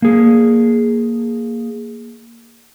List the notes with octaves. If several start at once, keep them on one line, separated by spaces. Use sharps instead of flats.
A#3 G#4